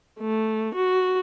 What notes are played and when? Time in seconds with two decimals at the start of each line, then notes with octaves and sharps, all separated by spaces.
0.20 A3
0.74 F#4